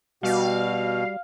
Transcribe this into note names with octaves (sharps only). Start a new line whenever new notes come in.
B2 G3 F#4 F5